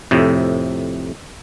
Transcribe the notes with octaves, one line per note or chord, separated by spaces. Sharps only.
F2 A2 C3